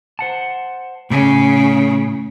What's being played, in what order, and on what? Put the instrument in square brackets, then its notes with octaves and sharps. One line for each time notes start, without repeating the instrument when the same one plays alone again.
[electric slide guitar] C5 F#5 A5
[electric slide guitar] A2 G#5 [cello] C#3